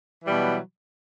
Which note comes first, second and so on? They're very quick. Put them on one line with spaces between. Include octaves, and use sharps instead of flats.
E3 G3 B2 F#3